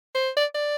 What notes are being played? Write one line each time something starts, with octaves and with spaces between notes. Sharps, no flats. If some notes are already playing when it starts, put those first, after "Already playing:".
C5
D5
D5